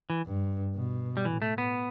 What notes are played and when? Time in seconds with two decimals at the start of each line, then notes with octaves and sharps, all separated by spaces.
0.10 E3
0.26 G2
0.75 B2
1.17 G3
1.25 A2 E3
1.42 A3
1.58 B3